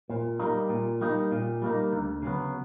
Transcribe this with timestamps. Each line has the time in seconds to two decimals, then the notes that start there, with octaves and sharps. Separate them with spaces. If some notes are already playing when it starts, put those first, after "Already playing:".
0.10 A#2
0.40 G3 A#3 D#4
0.69 A#2
1.01 G3 A#3 D#4
1.32 A#2
1.62 G3 A#3 D#4
1.92 D2
2.22 C#3 F#3 B3